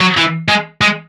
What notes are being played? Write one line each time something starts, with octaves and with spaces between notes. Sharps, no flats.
F#3
E3
G#3
G#3